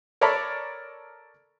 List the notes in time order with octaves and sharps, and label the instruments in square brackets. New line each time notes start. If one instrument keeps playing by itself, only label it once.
[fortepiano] A4 A#4 C#5 D5 A5 B5